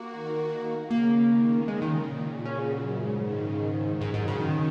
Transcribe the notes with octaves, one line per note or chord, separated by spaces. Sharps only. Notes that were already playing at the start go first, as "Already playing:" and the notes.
Already playing: A#3 F#4
D#3
C#3 A#3
D#3
C#3 G#3
D#3
A#2
C#3 C#4
G#3
F#3
F#2 C#3
G#2
D#3
G#2 F#3
G#2
C#3
D#3 C#4